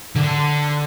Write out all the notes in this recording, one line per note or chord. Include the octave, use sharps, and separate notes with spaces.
D3